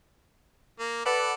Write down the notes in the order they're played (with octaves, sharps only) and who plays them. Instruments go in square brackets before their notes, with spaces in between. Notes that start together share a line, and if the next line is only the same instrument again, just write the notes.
[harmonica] A#3
[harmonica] A4 D5 [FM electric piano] B4 F#5 B5